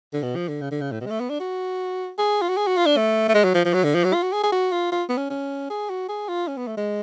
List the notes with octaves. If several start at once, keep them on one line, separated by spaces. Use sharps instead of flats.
D3
B2
F3
D3
C#3
D3
C#3
A2
B2
G#3
A3
B3
D4
F#4
G#4
F4
F#4
G#4
F#4
F4
D4
A3
A3
G#3
F#3
F3
F3
F#3
D3
F3
F#3
F4
F#4
G#4
G#4
F#4
F4
F4
B3
C#4
C#4
G#4
F#4
G#4
F4
C#4
B3
A3
G#3